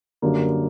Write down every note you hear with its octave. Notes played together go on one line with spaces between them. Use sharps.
F#2 D3 G3 A#3